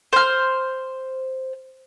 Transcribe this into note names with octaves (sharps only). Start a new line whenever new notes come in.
C5 F6